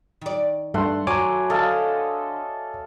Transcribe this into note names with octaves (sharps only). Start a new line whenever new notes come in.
D#3 D5
G2 A3 F#5 C6
F#3 C#5 G#5 D6
D3 A4 D#5 F5